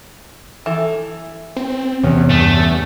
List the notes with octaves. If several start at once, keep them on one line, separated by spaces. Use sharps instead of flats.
E3 A4
C4
E2 C3 C#4
G2 A3